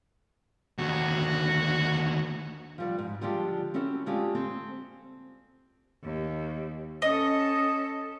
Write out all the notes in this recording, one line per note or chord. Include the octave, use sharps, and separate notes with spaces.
D#2 D3 F#4
F3 G3 F#5
G#2
D3 F3 G3 G#3 F4 G4
C4 C#4 E4 F#4 A4
D3 G#3 A3 F4 G4
C4 A4 C5
D#2
C#4 A4 D#5